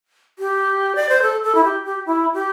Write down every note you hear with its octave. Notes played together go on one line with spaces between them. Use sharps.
G4
D5
C5
A4
A4
E4
G4
G4
E4
G4